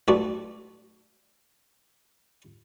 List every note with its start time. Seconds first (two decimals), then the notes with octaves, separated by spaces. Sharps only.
0.08 B1 B2 A3 D4 F#4